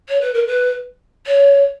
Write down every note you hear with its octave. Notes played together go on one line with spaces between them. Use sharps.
C#5
B4
A#4
B4
C#5